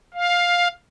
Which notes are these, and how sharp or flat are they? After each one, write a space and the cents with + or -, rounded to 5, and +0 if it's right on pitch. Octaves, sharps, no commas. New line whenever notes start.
F5 +10